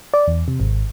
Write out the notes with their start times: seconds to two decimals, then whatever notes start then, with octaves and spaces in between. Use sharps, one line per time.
0.14 D5
0.27 E2
0.48 C3
0.60 G#1